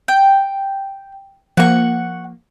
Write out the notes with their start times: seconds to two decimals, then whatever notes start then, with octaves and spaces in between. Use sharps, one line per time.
0.08 G5
1.57 F3 A#3 F#5 C#6